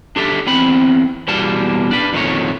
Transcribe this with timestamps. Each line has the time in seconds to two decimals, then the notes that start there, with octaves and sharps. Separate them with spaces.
0.16 D4 G4 A4 E5
0.47 E2 C4 B5
1.28 E2 B2 G3 A#3 A5
1.91 D4 B4
2.13 F2 A#2 D#3 F3 A3 C#5